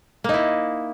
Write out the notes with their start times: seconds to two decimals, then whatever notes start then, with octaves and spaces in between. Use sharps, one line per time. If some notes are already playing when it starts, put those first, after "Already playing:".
0.24 A#3
0.29 D#4
0.34 E4